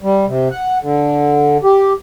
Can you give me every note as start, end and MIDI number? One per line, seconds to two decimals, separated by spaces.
0.01 0.25 55
0.26 0.48 48
0.51 0.78 78
0.82 1.58 50
1.63 1.93 67